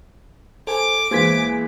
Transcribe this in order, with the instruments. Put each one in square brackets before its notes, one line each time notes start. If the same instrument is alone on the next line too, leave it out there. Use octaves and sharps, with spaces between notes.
[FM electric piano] A4 G#5 [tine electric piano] C5 [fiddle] D6
[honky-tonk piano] E2 E3 G#3 [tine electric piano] A#3 G#6 B6 [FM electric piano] C5